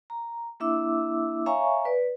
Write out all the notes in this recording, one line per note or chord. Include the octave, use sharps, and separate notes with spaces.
A#5
A#3 D4 E4 E5 D6 E6
C#5 E5 F5 G#5 A#5 C#6
B4 D5